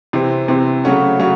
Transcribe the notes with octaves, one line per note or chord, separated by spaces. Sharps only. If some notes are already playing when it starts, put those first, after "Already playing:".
C3 E3 C4
C3 E3 C4
C#3 F#3 A3 C#4 F#4
C#3 F#3 A3 C#4 F#4